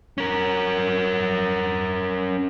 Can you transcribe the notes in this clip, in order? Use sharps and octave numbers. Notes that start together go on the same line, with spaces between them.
C#4 A#4